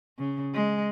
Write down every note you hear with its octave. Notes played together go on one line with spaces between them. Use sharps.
C#3
G#3